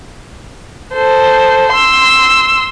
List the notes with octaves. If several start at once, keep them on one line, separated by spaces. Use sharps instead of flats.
A4 C5
C6 E6